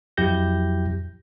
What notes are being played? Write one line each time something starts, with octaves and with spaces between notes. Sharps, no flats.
F2 F#3 E4 G4 G6 A#6